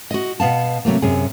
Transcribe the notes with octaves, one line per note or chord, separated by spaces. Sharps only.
F#4 D#5
B2 B3 F5 A5
C3 F#3 A3 A#3
F#2 C3 G#4